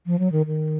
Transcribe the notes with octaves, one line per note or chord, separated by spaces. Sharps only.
F3
F#3
D#3
D#3